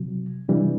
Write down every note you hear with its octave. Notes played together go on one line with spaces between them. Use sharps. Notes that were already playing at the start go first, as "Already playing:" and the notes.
Already playing: C3 F#3
C3 E3 G3 D4